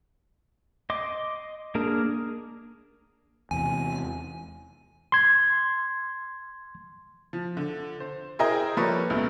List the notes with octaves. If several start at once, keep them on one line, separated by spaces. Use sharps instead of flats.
D#5 C6 D6
A#3 D4 G#4 A#4
E2 C3 G#5
C6 G#6
F3
D3
C5
E4 G#4 A#4 C5 D#5 G5
F3 G3 A#3 A4 B4 C#5
C#2 B2 A3